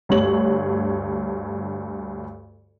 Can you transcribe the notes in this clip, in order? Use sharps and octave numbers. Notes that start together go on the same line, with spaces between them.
D2 G2 C#5 F#7